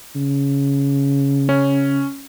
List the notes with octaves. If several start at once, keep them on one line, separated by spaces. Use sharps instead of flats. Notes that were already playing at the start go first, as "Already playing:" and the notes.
C#3
C#4